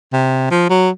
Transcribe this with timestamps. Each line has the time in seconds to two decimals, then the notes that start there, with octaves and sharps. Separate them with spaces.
0.13 C3
0.51 F3
0.70 F#3